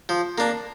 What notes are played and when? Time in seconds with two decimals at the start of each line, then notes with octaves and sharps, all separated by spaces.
0.09 F3
0.38 A#3 D4